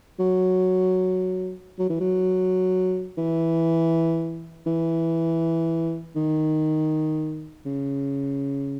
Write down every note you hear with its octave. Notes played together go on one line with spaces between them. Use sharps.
F#3
F#3
E3
F#3
E3
E3
D#3
C#3